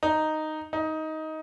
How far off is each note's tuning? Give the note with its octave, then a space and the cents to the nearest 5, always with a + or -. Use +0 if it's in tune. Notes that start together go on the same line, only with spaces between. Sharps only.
D#4 -5
D#4 +15